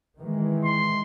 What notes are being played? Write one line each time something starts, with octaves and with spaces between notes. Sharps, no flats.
D#3 E3 G#3
C6